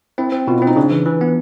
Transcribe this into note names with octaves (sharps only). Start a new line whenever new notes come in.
C4 E4
C4
B2 F4
C4 E4
D#4
C#3 D4
E3
E3
B3